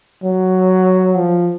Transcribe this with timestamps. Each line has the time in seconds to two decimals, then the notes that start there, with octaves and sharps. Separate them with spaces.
0.23 F#3
1.15 F3